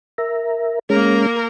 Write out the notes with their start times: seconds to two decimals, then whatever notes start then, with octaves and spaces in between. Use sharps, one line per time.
0.18 A#4 E5 A#5
0.90 G#3 A#3 C#4 A#4